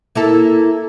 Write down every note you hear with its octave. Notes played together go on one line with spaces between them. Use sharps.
A#3 E4 A4